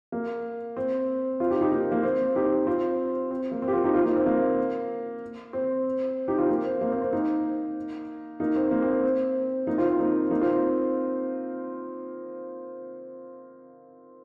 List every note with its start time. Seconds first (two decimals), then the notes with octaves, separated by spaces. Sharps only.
0.12 A#3
0.77 C4
1.40 C4 F4
1.50 D#4 G4
1.61 D#4 G4
1.72 A#3 D#4
1.92 A#3
2.03 C4
2.35 D#4 G4
2.67 C4 F4
3.31 C4
3.52 A#3
3.62 C4
3.68 G4
3.73 C4 F4
3.84 D#4 G4
3.94 C4 F4
4.05 A#3 D#4
4.16 C4
4.26 A#3
5.53 C4
6.28 D#4 G4
6.38 C4 F4
6.49 A#3
6.65 C4
6.81 A#3
6.92 C4
7.02 C4
7.13 A#3 D#4
8.40 A#3 D#4
8.56 C4
8.71 A#3
8.82 C4
8.93 C4
9.67 A#3 D#4
9.78 C4 F4
9.88 C4
9.99 A#3 D#4
10.31 A#3 D#4
10.41 C4 F4